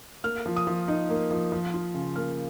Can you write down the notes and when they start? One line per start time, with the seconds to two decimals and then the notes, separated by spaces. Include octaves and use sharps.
0.24 A#3 F6
0.46 F3
0.56 D#6
0.67 F3
0.88 D#4
1.10 A#3
1.31 F3
1.52 F3
1.74 F4
1.94 C#3
2.16 A#3 F6